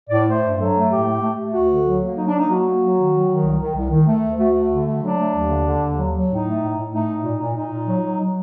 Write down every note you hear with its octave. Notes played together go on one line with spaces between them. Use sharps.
A2 D5
A3 C5
G2
F#3 A4
A3
A2 G4
A3
A3
A3
D2 F#4
D3
F#3
A#3
F#3 D#4
D4
A#3
D#4
F#3 F#4
A#3
F#3
D#3
F#3
D#3
C2
D#3
C2
D#3
A3
D2
A3 F#4
A3
D3
A3
F#3 D4
A3
D#2
D3
D3
D#2
F#3
F#3
A2 D#4
A3
A2
A2
A3 D#4
A2
A#2
A#2
A#2 D#4
A#2
F#3
F#3
F#3